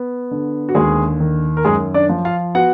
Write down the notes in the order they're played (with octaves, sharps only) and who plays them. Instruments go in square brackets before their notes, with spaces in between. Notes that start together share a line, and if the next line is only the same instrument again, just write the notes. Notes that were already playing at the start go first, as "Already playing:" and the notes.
Already playing: [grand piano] B3
D3
F#4
D#2 G#3 G#4
D#3
A#4
F#2 G#3 G#4
D4 D5
F3
F4 F5
B3 F#4 F#5